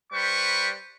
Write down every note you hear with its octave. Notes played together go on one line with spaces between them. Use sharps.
G3 B4 C5 C#6